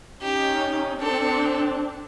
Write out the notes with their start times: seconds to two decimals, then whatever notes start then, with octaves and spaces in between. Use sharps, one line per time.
0.22 C#4 D#4 G4
1.00 C4 D4 A4